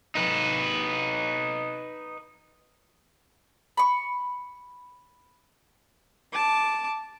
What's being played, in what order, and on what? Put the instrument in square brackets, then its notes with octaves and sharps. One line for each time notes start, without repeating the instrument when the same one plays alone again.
[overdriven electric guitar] D#4 B4
[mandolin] B5 C#6
[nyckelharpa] A5 D6